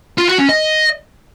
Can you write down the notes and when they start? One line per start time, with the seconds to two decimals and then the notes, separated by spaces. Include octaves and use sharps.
0.18 F4
0.28 F#4
0.38 C#4
0.49 D#5